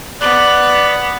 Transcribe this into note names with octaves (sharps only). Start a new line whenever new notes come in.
B3 D5 F#6